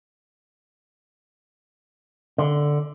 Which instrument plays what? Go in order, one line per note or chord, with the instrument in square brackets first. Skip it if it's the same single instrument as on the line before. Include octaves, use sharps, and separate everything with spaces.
[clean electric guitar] D3